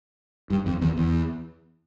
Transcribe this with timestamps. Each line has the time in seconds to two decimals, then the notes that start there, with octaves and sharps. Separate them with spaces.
0.50 G2
0.66 F2
0.81 E2
0.97 E2